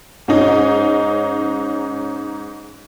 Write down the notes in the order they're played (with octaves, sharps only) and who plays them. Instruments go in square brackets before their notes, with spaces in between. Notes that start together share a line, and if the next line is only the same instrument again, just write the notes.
[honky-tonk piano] G#2 C#4 D#4